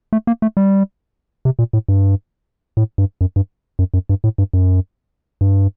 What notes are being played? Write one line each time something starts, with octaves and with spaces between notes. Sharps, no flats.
A3
A#3
A3
G3
C3
A#2
A2
G2
A2
G2
F#2
G2
F#2
F#2
G2
A2
G2
F#2
G2